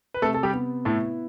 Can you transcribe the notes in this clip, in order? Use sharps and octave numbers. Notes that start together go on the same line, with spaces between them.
B4
C3 A3 A4
A4
G3 G4
B3
A2 A3 E4